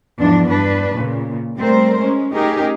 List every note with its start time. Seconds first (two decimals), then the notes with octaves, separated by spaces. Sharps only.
0.18 E2 G#2 F3 D4
0.49 G2 D4 B4
0.94 A#2 C#3
1.57 G3 A3 C4 A#4 C5
2.00 G#3 C#4
2.34 A3 C#4 D#4 G4 G#4 A#4